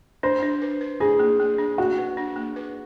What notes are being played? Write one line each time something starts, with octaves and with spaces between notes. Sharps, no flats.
D4 C5
D4
B4
B4
D4 G#4
A#3
A#3
D4
A#3 F#4
B4
D4
A#3
B4